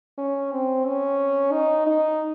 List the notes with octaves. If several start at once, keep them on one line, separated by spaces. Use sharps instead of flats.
C#4
C4
C#4
D#4
D#4